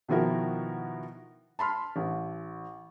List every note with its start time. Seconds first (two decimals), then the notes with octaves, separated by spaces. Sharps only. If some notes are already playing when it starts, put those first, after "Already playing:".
0.08 B2 D#3 F3 E4 F#4 A#4
1.59 A5 B5 C6 F6
1.96 A1